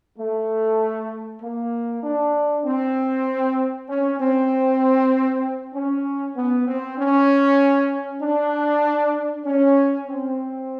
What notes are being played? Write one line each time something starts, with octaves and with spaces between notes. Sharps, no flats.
A3
A#3
D4
C4
C#4
C4
C#4
B3
C4
C#4
D4
C#4
C4